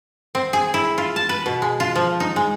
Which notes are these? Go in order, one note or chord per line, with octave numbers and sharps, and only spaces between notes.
C4
G#4
E4
F4
A5
B4
B2
G#3
F4
F3
D#4
G#3